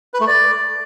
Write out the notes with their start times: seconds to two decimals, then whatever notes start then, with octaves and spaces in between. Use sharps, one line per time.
0.14 B4
0.20 A3
0.27 D5